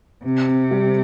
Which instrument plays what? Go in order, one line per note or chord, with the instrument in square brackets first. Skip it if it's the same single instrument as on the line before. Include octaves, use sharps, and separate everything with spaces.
[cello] C3 [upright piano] C4
[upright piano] C4
G3